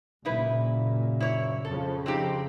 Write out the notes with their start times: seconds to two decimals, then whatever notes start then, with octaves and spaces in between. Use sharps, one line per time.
0.25 F#1 A#2 D#4 E4 B4
1.20 E4 C#5
1.65 F2 C#3 F3 A4
2.06 C4 D#4 G4